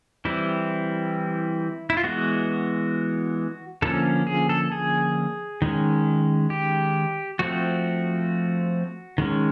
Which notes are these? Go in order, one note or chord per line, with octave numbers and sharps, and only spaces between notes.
E3 G3 C4 E4
E4
F4
E3 G#3 B3 F#4
D3 F3 A#3 C#4 A4
G#4
A4
G#4
D#3 G#3 C#4
G4
F3 A3 C4 F#4
D#3 G#3 C#4